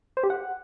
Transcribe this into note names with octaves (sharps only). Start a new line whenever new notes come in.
C5
G4
F#5